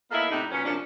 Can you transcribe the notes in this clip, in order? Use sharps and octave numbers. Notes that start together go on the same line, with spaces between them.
A#3 B3 D#4 E4 A4 F5
A2 C3 D4 D#4
F#2 A#2 B3 C#4
C3 F3 A#3 C#4 D4